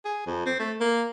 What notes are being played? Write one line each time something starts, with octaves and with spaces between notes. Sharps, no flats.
G#4
F2
C4
A3
A#3